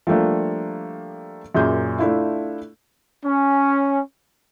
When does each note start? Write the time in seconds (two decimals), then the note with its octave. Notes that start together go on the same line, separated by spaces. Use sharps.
0.07 F3 G3 A3 A#3 D4
1.55 F#2 A#2 G#4 G6
1.99 A3 D4 E4 F4
3.24 C#4